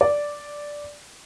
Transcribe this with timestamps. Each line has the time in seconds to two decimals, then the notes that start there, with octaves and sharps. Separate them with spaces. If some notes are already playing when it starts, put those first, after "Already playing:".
0.01 D5